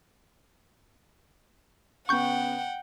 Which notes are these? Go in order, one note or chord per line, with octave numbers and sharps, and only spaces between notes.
C#3 B3 F#5 G5 C#6 G6